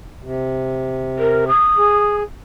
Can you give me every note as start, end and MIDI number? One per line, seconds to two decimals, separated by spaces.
0.23 1.50 48
1.19 1.45 70
1.48 2.13 87
1.78 2.23 68